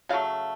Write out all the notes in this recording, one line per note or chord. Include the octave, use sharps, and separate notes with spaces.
C#3 F#3 A3 F5